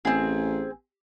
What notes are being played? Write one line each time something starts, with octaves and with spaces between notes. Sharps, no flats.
A1 C4 G#4